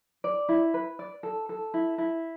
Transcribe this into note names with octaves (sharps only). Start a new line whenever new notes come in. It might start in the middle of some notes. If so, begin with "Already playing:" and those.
D5
E4
B4
D5
A4
A4
E4
E4